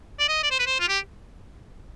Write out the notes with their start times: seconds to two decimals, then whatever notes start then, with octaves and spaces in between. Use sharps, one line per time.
0.19 D5
0.29 D#5
0.43 D5
0.51 C5
0.59 B4
0.67 C5
0.80 F4
0.88 G4